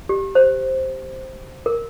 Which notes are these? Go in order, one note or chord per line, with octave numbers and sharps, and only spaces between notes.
G4
C5
A#4